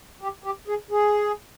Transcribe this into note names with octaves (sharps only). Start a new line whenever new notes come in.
G4
G4
G#4
G#4